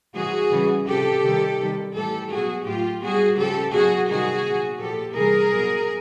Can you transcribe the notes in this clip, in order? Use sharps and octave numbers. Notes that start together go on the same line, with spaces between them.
C3 E3 G3 F#4 G#4
C#3 E3 G3
C3 F3 G4 A4
C3 D#3 G3
C3 D#3 G3
A2 E3 G3 G4 A4
B2 F#3 F#4 G#4
A2 F#3 F4 G4
B2 G3 F#4 G#4
C#3 F3 G4 A4
B2 F#3 F#4 G#4
C3 D#3 G3 F#4 G#4
A#2 F#3
A#2 F3 G4 A4
C3 E3 G3 G#4 A#4
B2 F#3